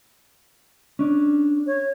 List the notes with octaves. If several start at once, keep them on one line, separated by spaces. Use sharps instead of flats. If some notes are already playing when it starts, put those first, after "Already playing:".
C#4 D4
C#5